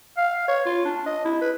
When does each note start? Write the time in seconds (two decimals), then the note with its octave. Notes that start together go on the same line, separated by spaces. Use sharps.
0.17 F5
0.48 C#5
0.65 F4
0.85 D4
1.06 D#5
1.25 E4
1.41 B4